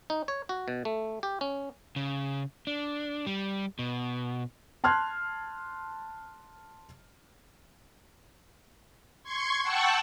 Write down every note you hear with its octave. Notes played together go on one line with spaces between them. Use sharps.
D#4
C#5
F#4
B2
A3
G4
C#4
C#3
D4
G3
B2
A5 C6 F6 F#6 G#6
C6 C#6 G#6
F#5 G5 A5 C#6 E6 F#6